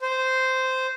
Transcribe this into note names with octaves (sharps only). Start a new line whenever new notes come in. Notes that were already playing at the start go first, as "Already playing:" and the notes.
C5